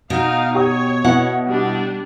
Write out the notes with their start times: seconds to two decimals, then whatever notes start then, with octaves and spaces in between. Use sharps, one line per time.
0.10 B2 D#4 F5
0.55 G4 C#5 C#6 D#6
1.05 B2 E4 F#5
1.48 G3 D4